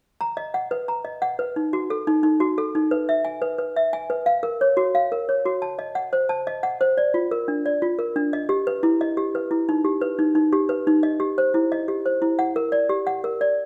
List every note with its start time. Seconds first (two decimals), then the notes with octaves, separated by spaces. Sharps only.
0.21 A#5
0.37 D#5
0.54 F#5
0.71 B4
0.88 A#5
1.05 D#5
1.22 F#5
1.39 B4
1.56 D#4
1.73 F#4
1.90 A4
2.07 D#4
2.23 D#4
2.40 F#4
2.58 A4
2.75 D#4
2.91 B4
3.09 E5
3.25 G#5
3.42 B4
3.58 B4
3.76 E5
3.93 G#5
4.10 B4
4.26 F5
4.43 A#4
4.61 C#5
4.77 F#4
4.95 F5
5.12 A#4
5.29 C#5
5.46 F#4
5.62 A5
5.79 D#5
5.95 F#5
6.13 C5
6.29 A5
6.47 D#5
6.63 F#5
6.81 C5
6.97 D5
7.14 F4
7.31 A#4
7.48 D4
7.66 D5
7.82 F4
7.99 A#4
8.16 D4
8.33 D#5
8.49 G4
8.67 B4
8.83 E4
9.01 D#5
9.17 G4
9.35 B4
9.51 E4
9.69 D#4
9.85 G4
10.01 B4
10.19 D#4
10.35 D#4
10.53 G4
10.69 B4
10.87 D#4
11.03 D#5
11.20 G4
11.38 C5
11.54 E4
11.72 D#5
11.88 G4
12.06 C5
12.22 E4
12.39 F#5
12.56 A#4
12.72 D5
12.89 G4
13.07 F#5
13.24 A#4
13.41 D5